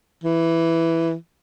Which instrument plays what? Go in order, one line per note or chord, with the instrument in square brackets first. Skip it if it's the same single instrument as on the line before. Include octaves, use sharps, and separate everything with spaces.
[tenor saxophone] E3